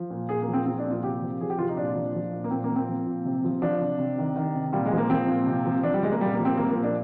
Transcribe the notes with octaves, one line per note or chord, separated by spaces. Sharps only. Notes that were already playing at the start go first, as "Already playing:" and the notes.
Already playing: F3
A#2
A#2 G#4
A#3
F3
C4
F3 C4
D4
A#2
F4
C3 G4
F3
F3 G#4
G4
C3 F4
D#4
A#2 D4
F3
F3
A#2
A#3
A#2 C4
A#3
F3
C4
F3
A#2
C3
F3
F3 D4
C3
C3
D#3
D#3
C3
A#2 G3
G#3
F3
A#3
F3 C4
A#2
C3
F3
F3 D4
G3
C3 G#3
A#3
A#2 G3
A#3
F3
C4
F3 A#3
A#3
A#2
D4